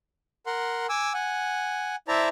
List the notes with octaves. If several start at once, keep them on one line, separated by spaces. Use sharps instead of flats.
A#4 F#5 C6
G#5 D6 E6
F#5 G#5
E4 C5 D5 E5 A5 A#5